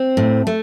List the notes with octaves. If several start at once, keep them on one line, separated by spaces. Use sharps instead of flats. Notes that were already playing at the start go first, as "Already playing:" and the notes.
Already playing: C4
A2
A3